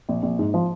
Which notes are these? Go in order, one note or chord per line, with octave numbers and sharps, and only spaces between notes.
A#1
A#1
G#2
F3